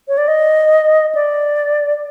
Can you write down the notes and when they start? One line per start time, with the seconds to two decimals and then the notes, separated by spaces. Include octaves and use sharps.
0.08 C#5
0.18 D5
0.28 D#5
1.15 D5